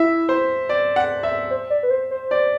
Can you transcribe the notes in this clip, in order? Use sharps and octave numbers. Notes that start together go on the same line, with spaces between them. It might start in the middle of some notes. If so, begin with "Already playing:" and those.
Already playing: E4 E5
C5
D5
F#5
E5
C5
D5
B4
C5
C5
D5